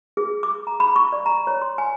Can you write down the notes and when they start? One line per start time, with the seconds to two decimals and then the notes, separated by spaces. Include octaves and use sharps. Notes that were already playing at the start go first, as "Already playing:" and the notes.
0.17 G#4
0.43 D6
0.67 A#5
0.80 B5
0.96 C#6
1.13 D5
1.26 A#5
1.47 C#5
1.62 C6
1.78 G#5